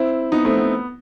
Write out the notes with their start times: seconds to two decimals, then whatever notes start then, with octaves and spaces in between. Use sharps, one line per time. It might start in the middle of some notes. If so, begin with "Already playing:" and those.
Already playing: C4 E4
0.32 B3 D#4
0.45 A3 C4
0.58 B3